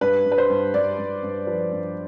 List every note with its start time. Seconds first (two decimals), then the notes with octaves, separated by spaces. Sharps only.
0.01 G2 B4
0.25 G2
0.32 B4
0.38 C5
0.50 G2
0.74 G2 D5
0.98 G2
1.23 G2
1.47 F3 B4
1.72 G2